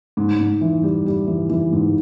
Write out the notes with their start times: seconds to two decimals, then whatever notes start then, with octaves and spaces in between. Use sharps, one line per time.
0.17 G#2
0.39 G#2
0.61 E3
0.83 G3
1.06 G3
1.27 E3
1.50 E3
1.72 G#2